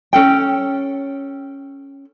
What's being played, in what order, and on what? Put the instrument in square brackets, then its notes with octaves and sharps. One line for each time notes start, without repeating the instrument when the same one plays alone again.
[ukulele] C#4 A4 G5